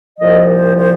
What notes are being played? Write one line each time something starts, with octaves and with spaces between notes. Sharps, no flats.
C2 A#2 F3 D#5
C5
C5